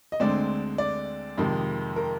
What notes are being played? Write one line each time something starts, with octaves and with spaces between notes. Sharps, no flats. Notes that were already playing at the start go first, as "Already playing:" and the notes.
D#5
D2 D3 G#3 C4 D5
D5
F2 C3 D#3 G#3
A#4